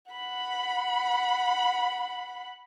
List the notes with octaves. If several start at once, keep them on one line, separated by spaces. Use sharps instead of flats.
F#5 B5